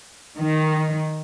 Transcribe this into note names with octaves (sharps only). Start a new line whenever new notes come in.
D#3